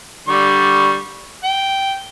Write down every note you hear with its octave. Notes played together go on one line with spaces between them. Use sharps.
D3 G3 C#6
G5